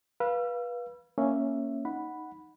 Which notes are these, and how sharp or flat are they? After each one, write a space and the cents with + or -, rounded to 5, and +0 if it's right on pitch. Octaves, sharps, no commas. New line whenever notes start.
B4 -25 F5 +0 E6 +35
A#3 +0 C#4 +0 E5 +0
D#4 +0 F#5 +0 B5 +0